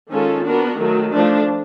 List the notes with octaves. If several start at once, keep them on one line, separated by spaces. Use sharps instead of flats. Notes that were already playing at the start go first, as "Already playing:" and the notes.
D#3 G#3 C#4 F4 A4
B3 D4 F#4 A#4
D#3 F#3 A3
F3 A3 D4